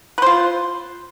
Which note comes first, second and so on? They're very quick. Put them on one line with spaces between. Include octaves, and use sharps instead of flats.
B4 C5 F4